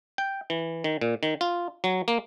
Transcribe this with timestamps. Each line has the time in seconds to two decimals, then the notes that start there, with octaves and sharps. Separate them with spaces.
0.18 G5
0.50 E3
0.84 D#3
1.01 A#2
1.23 D#3
1.41 F4
1.84 F#3
2.08 A#3